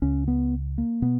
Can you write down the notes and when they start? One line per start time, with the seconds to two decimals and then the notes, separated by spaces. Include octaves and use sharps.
0.02 C#2 C#3 C#4
0.28 B3
0.78 A#3
1.02 B2 B3